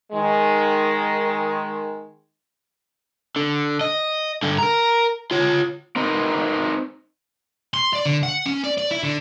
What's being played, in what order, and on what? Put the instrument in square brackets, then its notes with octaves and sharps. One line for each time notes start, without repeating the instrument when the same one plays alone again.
[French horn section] D#3 G#3
[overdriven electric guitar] D3
D#5
G2 D3
A#4 A#5
F4 C#5
[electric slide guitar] C4 D#4 A#4 B4
[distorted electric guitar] C6
D5
D3
F#5
C#4
D5
D5
E4
D3